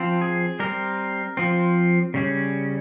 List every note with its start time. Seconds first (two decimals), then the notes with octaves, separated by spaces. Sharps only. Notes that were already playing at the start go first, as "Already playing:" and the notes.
Already playing: F3 C4
0.21 G#4
0.60 G3 C4 A#4
1.37 F3 C4
2.14 C#3 G3 C#4